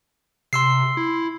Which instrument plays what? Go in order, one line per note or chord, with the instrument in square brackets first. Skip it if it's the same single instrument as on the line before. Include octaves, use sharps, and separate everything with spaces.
[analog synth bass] C3 [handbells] C6 E6 C7
[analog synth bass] E4